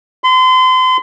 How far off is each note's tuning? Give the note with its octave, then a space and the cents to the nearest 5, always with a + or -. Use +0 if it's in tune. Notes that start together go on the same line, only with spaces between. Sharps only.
C6 -35